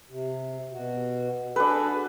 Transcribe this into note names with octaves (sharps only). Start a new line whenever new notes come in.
C3
B2 F#4
D4 F#4 G#4 A4 B4